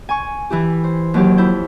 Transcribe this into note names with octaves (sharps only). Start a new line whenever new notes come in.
G#5 C#6
E3 E4 G4
C5
D#2 F#3 G4
F2 E4 G6